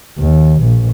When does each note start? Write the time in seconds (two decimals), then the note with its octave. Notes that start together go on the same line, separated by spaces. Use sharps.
0.19 D#2
0.62 A#1